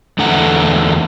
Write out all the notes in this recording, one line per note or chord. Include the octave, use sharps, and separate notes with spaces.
E2 D3 A3 F#5 A#5